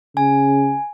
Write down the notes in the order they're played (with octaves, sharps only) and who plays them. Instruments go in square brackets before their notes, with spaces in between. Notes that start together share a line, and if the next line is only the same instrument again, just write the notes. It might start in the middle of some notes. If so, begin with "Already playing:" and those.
[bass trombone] C#3 [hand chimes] G#5